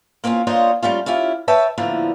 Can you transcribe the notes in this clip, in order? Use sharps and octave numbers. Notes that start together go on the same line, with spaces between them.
A#3 C4 C#4 D#4 F4
A#3 D4 F4 C5 C#5 D#5
G3 A3 C#4 F4
C#4 E4 F4 G4
B4 C#5 E5 G5 A5
A2 D3 F3 A#3 B3